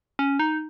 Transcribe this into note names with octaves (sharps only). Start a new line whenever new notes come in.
C#4
D#4